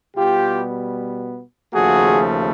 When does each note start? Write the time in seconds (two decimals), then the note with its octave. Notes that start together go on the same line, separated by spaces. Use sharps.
0.16 B2 G3 B3 F4 G4
1.72 D#2 C#3 F3 A3 F#4 G#4